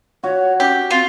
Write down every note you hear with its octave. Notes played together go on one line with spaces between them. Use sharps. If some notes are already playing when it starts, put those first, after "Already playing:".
F#4 C#5
C#4 G4
C4 F4